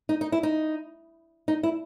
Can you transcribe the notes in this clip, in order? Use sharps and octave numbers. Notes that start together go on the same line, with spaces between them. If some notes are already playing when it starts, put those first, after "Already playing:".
D#4
D#4
E4
D#4
D#4
E4